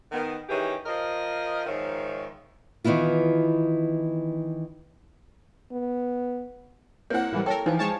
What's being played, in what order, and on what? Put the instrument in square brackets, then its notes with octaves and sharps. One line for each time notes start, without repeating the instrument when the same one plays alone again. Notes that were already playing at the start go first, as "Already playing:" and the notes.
[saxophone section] D#3 B3
D#3 E3 C#4 G4 G#4
F3 A#4 C5 D#5
G#2 D#3 F3 C#5 E5
[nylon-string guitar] D#3 E3 B3 E4 F4
[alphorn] B3
[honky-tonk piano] A#3 C4 F#5 [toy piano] E4 C#5
[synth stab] A2 E3 G3
[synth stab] A4 A#4 [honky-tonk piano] C#5 [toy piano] G5
[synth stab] E3 [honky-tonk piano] F3 F4 [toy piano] D#4 G#5
[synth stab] G#3 C#5 A5 [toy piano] G#5